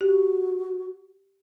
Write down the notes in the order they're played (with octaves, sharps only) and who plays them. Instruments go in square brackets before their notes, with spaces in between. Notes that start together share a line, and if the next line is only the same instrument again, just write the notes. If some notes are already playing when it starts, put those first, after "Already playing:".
[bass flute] F#4 [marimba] G4